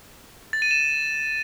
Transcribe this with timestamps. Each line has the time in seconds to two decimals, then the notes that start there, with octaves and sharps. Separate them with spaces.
0.53 A6
0.62 D#7
0.71 E7